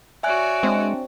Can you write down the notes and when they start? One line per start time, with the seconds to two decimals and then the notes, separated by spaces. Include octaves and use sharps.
0.23 F#4 C#5 D5 E5 G#5 F#6
0.63 G#3 C4 D4